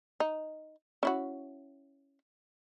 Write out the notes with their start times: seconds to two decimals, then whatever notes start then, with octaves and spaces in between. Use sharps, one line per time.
0.20 D#4
1.03 C#4 E4 F#4